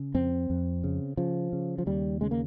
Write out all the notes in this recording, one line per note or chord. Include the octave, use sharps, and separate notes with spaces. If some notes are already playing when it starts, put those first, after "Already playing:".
Already playing: C#3
F2 C4
F2
C#3
C#3 F3
C#3
F3
D#2 G3
C#3 G#3
A#3